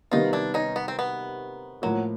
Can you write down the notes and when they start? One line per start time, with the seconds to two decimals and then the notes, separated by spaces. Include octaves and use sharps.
0.11 C3 D#3 G3 B3 D#4 F4
0.33 D4 E4
0.54 C#4 D#4
0.76 B3
0.88 C4
0.99 B3
1.82 A2 F3 F#3 A#3